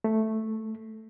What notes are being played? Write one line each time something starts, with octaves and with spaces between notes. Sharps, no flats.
A3